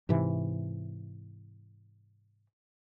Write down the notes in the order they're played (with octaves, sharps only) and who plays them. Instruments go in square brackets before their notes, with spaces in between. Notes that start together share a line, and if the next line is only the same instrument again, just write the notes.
[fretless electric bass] G#2 C3 E3